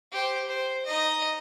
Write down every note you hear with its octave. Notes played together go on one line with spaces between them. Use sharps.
G4 C5
C5
D#4 D#5